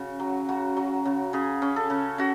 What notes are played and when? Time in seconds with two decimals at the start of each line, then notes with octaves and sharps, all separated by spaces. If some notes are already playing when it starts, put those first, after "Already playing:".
Already playing: C#3 F#4
0.20 F#3
0.49 C#3 F#4
0.77 F#3
1.05 C#3
1.33 C#3 G#4
1.62 C#4
1.76 A4
1.90 C#3
2.18 C#3 F#4